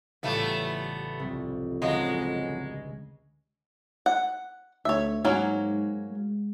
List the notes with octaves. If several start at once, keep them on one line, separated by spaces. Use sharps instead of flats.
A1 C#3 G3 A3 B3 F4
C2 F2
C#2 D3 F3 F#3 G#3 D#5
F#5
D2 C#5 E5
G#2 F#3 A#3 C#4
G#3